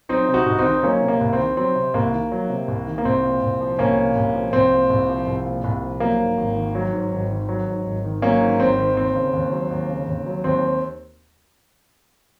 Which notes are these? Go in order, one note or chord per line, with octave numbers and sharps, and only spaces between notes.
F#3 C4 D#4
C3
D#4 F#4
C2
C4 D#4
D#3
F#3 A#3 C#4
C3
A#3
C2
C4
D#3
F#3 C4
C3
C2 A#3
D#3
F#3
C3
C2
D#3
A#3
C2 C4
A#2
C2
F3
C2 A#3 C#4
A#2
C2
F3
C2 C4
A#2
C2
F3
C2
A#2
C2
F3
F#3 A#3
G#2
G#1
D#3
F#3
G#2
G#1
D#3
F#3
G#2
G#1
D#3
F#3 A#3 C#4
G#2
G#1 C4
D#3
D#2 C4
C#3
D#2
F#3
D#2
C#3
D#2
F#3
D#2 C4